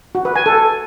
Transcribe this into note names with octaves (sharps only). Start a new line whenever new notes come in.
F#4
B4
G#5
A4